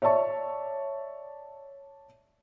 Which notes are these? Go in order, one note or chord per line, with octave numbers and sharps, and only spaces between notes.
C#5 D5 E5 A5 C#6